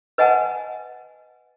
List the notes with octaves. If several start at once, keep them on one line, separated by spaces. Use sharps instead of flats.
B4 D#5 F#5 G#5 A5